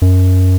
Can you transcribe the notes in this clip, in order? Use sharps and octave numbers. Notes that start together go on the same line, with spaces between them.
F#2